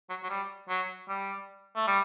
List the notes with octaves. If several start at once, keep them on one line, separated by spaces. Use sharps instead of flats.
F#3
F#3
G3
F#3
G3
A3
G3